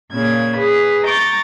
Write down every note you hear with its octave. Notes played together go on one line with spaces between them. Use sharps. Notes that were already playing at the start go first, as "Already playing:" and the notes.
A#2 C#3 A#3 G#6
G#4 B4
A#5 C#6 D6 G6 A6